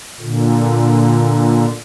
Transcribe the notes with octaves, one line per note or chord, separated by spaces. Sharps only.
A#2 D3